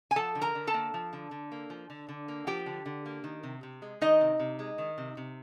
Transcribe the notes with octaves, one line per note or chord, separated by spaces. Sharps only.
G#5
F3 A4 A5
D3
A#4 A#5
D3
A4 A5
A#3
F3
D3
D3
A#3
F3
D3
D3
A#3
F3 G4 G5
D3
D3
A#3
D#3
C3
C3
G#3
D#3 D#4 D#5
C3
C3
G#3
D#3
C3
C3